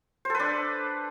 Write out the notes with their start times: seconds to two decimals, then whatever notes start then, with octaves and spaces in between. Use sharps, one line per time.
0.25 C5
0.30 A4
0.35 B4
0.40 D4